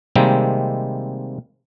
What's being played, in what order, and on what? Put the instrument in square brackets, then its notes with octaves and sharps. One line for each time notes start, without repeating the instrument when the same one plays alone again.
[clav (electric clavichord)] C3 D#3 G3 G#3 A#3 C4